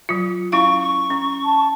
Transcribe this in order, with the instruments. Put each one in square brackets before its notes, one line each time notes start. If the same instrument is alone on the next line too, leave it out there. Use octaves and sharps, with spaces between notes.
[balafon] F#3 F4
[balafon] C#4 E4 F5 [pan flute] C#6
[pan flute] C#6
[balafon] C#4
[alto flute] A5